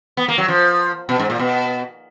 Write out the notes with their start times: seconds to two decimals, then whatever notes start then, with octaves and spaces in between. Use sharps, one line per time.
0.17 B3
0.28 A#3
0.38 F#3
0.48 F3
1.09 B2
1.19 G#2
1.30 A#2
1.39 B2